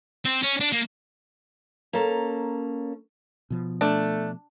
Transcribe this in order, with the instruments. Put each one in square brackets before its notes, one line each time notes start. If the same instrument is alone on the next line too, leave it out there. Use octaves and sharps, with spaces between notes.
[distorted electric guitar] C4
C#4
D4
A#3
[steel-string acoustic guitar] A#3 C#4 A4 A#5
[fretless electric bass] B2 F3
[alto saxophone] A3 [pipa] D4